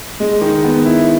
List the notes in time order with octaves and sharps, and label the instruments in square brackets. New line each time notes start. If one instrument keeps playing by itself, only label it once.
[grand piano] G#3
D#3
B3
E4